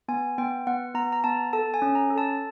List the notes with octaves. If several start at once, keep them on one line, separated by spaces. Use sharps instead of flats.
B3 G#5
B3 G5
B3 F#5
B3 A#5
A#5
B3 A5
A4 A5
G#5
C#4
A#5
A4
A5